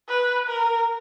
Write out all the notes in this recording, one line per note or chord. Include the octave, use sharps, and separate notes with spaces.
B4
A#4